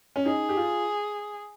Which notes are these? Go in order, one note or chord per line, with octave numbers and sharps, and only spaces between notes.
C#4
D#4 G#4
G4
F4